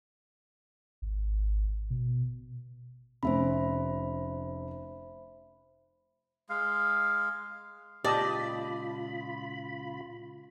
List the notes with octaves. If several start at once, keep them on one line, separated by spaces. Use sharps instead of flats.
G#1
B2
F1 C#4 C5 E5 B5
G#3 F5
C#2 A#2 F4 G4 D5 D#5 A5 B5